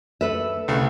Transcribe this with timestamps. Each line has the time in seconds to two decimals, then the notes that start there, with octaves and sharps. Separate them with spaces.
0.21 A4 B4 E5
0.68 C2 C#3 A3